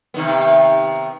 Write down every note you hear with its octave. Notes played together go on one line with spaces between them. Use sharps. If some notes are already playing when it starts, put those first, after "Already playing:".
C3 D#3 B3